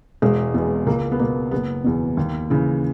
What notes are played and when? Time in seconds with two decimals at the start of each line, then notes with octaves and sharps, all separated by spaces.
0.22 E1 G#3
0.54 E2 B2
0.86 C#2 A#3
1.11 B3
1.19 B2 A#3
1.51 F#1 B3
1.84 E2 B2
2.17 D#2
2.50 C#3 E3